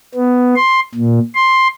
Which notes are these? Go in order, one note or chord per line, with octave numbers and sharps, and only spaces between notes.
B3
C6
A#2
C6